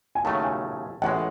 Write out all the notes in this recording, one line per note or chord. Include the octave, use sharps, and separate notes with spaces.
G#5
D#2 C#3 F#3 A3 A5
G#5
A1 A2 G#3 F#5